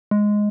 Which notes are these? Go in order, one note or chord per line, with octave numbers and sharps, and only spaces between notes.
G#3